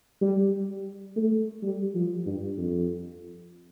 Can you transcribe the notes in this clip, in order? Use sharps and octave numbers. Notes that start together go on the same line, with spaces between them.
G3
A3
G3
F3
G2
F2